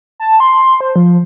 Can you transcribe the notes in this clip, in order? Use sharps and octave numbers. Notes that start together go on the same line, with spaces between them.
A5
C6
C5
F3